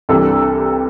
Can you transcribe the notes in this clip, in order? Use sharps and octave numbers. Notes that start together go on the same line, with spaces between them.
C2 C3 E3 G3 D4 A4